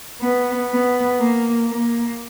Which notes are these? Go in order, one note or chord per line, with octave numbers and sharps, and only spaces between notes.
B3
B3
A#3
A#3